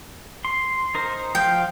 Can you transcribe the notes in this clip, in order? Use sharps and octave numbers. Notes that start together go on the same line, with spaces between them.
C6
D#4 A#4 C5
F3 F5 G5